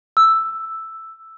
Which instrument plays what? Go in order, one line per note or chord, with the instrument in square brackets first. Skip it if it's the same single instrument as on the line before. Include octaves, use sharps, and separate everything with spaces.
[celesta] E6